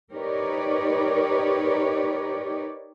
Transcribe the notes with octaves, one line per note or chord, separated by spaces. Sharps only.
D#4 G4 A#4 B4 C#5 D5